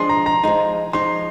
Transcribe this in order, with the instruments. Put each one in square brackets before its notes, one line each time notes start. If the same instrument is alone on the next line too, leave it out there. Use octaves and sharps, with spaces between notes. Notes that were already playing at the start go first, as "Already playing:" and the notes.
Already playing: [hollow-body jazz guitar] F3 G#3 D4 G#4 [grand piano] C6
[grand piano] A#5
A#5
[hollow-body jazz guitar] F3 G#3 D#4 [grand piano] A#5
[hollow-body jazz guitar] F3 G#3 D#4 [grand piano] C6